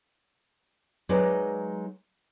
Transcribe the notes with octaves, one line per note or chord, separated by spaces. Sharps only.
F#3 G#3 D#4 B4 D5